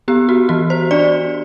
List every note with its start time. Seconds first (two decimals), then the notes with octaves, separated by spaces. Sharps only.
0.08 B3 G4
0.29 F#4
0.49 E3 F#4
0.70 C5
0.91 D4 D5